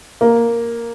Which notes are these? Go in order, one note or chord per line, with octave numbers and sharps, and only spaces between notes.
A#3